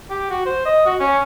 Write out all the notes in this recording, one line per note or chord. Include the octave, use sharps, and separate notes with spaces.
G4
F#4
C5
D#5
F#4
C#4